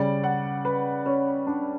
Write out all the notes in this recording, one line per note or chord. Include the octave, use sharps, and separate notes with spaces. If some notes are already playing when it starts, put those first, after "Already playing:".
Already playing: C#3 G3 D5
F#5
B4
C#4
D4